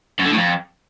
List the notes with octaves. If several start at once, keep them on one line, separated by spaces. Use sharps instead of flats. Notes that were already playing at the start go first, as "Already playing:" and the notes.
F#2
D3
A2
F2